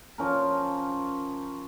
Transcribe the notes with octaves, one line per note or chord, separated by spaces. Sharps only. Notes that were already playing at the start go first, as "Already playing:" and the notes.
F3 C#4 A#4